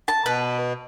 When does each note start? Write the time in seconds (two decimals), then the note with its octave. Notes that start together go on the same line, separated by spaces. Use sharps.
0.08 A5
0.25 B2 B4